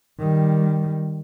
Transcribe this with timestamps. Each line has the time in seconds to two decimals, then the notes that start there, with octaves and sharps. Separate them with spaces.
0.19 D#3 G3